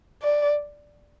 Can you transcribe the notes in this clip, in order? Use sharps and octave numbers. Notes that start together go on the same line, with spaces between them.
D5